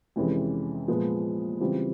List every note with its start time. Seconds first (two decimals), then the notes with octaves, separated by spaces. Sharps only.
0.16 F2 C3 E3 G#3 C#4
0.88 A#2 F3 G#3 B3
1.60 C#3 E3 G3 C4 F4